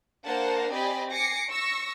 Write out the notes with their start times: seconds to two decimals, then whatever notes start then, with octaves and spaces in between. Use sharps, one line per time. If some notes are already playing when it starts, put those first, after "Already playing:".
0.26 A#3 D4 A#4 C5 F#5 A5
0.70 C4 G4 D5 D#5 G#5 B5
1.10 G#5 D6 A#6 C7 C#7
1.49 C#6 E6 A#6